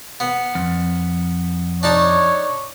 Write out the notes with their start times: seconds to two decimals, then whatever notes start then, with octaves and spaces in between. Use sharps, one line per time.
0.20 B3
0.55 F2
1.83 D4 D#4 C#5 A5